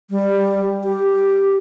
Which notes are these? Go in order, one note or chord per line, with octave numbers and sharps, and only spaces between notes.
G3
G4